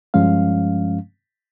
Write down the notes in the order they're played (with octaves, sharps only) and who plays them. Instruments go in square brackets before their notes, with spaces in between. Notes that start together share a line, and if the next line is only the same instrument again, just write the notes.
[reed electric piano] G2 F3 G#3 C#4 F5